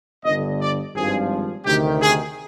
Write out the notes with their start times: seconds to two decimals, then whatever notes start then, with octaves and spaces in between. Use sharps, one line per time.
0.24 G1 G2 D3 D#5
0.61 D5
0.95 G#1 G2 F3 G#4
1.66 D2 C3 D#3 G4
2.02 G#4